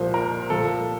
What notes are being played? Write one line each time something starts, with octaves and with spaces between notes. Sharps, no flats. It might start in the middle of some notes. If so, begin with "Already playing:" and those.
Already playing: C2 A#2 F3 C5
A#4
C2 A#2 F3 A4